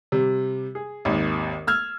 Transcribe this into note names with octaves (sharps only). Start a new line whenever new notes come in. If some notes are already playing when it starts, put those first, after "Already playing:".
C3 G3
G#4
G#1 D#2
E6 F6 G#6